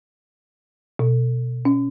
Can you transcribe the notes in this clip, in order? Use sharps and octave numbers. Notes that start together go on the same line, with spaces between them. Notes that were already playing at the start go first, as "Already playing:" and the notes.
B2
C#4